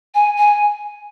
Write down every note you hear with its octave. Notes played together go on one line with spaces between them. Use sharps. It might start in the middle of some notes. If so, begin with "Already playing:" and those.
G#5
G#5